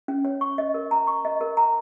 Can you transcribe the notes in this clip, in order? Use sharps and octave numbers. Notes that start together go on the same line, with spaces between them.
C#4
C#5
C#6
D#5
A#4
A#5
C#6
D#5
A#4
A#5